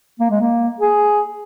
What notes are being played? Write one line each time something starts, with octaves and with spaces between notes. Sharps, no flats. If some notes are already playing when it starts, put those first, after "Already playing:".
A#3
G#3
A#3
G#4